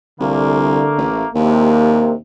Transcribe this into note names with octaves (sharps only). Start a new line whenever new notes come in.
C2 D3 A3 A#3
A1
A#1 D#2 C3 A#3